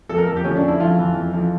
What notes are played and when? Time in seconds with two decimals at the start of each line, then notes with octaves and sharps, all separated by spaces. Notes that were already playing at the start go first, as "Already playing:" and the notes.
0.09 F2 A4
0.18 A#4
0.27 F2 A4
0.36 G4
0.44 F3 C#4
0.57 D4
0.63 F2
0.68 E4
0.80 F2 F4
0.98 E3
1.15 F2
1.33 F2